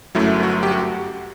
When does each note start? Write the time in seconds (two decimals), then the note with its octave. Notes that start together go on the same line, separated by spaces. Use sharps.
0.15 G1 F#2 F#3 A3 E4
0.43 F#4
0.63 G4
0.71 F#4